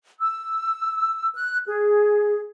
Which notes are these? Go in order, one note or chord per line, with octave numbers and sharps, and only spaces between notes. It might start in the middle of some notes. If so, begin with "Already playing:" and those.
E6
F#6
G#4